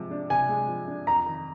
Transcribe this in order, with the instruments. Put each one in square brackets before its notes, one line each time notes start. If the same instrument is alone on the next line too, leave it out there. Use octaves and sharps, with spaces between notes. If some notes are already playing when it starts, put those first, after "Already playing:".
Already playing: [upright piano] C3 F3 G#3
D4
[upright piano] C3 [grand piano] G#5
[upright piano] G#3
F3
D4
[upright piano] F2 [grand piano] A#5
[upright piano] D#3